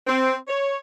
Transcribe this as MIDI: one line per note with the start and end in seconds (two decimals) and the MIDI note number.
0.07 0.35 60
0.48 0.77 73